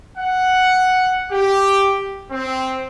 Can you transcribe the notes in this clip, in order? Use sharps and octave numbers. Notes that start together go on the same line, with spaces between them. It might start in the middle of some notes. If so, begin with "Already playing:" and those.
F#5
G4
C4